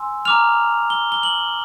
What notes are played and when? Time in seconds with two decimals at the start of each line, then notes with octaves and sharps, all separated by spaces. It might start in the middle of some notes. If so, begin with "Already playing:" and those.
Already playing: G#5 C6 E6
0.25 A#5 D6 F6 F7
0.90 G7
1.12 G7
1.23 F#7